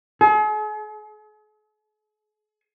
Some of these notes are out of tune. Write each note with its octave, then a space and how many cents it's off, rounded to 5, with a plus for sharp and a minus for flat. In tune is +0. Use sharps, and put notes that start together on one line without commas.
G#4 +45